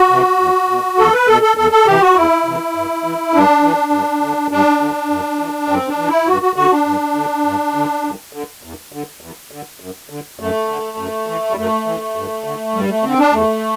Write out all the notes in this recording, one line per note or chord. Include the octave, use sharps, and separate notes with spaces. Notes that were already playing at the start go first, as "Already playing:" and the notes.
Already playing: F#4
C3 E3
E2
B2
E2 A4
B4
B2 A4
A4
E2 A4
A4
C3 E3 G4
F#4
E2 E4
C3 E3
G2
E3
G2 D4
E3
G2
D3
G2 D4
D3
F#2
E3
F#2 C4
D4
E3
E4
G2 F#4
F#4
D3 F#4
D4
G2
D3
G2
D3
G2
D3
E2
D3
E2
D3
F#2
D3
F#2 A3
D3
F#2
E3
G3
F#2 A3
E3
G2
D3
G2 G3
A3
D3 C4
D4
E2 A3